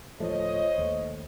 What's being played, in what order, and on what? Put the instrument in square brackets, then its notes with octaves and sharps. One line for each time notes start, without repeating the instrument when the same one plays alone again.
[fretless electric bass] D1 F3 A3 [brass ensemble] C5 C#5 D#5
[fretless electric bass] D#2 A3